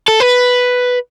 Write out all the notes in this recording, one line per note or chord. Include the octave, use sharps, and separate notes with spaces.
A4
B4